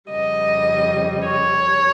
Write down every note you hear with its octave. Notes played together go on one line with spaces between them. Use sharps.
F2 C#3 G3 D#5
C#5